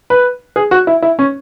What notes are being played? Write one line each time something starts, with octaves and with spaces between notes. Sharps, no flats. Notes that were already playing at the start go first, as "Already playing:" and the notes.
B4
G#4
F#4
E4
E4
C#4